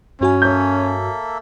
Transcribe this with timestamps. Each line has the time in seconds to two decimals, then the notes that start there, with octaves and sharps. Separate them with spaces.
0.21 G2 C#4 E4 F#4 G#5
0.42 A#3 A4 C#5 E5 G6